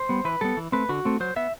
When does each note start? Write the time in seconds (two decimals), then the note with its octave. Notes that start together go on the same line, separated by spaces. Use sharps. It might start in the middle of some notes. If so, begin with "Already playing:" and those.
Already playing: C5
0.09 G3 B3
0.25 E3 B4
0.41 G3 B3 A4
0.57 E3
0.72 A3 C4 B4
0.89 D3 F#4
1.05 A3 C4
1.20 F#3 C5
1.36 B3 E5